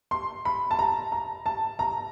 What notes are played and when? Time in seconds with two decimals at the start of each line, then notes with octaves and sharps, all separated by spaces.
0.11 C6
0.45 B5
0.71 A5
0.79 A#5
1.12 A#5
1.46 A5
1.79 A#5